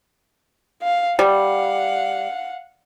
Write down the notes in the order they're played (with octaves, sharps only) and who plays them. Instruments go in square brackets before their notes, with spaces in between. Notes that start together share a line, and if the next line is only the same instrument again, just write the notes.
[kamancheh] F5
[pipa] G3 [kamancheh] F5 F#5